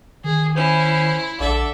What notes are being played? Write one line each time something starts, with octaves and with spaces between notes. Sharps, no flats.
D#3 G#4
C#4 E4 C5
A#1 D3 A4 D5 E5